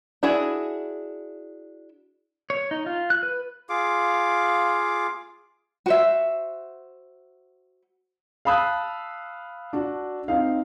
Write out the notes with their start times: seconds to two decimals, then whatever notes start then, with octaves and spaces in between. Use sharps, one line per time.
0.23 D4 E4 F#4 G#4
2.50 C#5
2.71 D#4
2.86 F4
3.10 F#6
3.23 B4
3.69 F4 G#4 F5 D6
5.86 F#4 C5 E5
8.45 F5 A5 B5 D#6 E6 F#6
9.73 D4 F#4
10.28 C4 D#4 F5